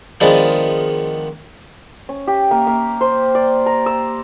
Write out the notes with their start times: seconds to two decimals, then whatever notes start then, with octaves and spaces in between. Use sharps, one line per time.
0.20 D#3 F3 G#3 B3 D4
2.09 C#4
2.27 G4
2.51 A#3
2.67 A#3
3.01 C5
3.35 D5
3.66 A#5
3.86 E6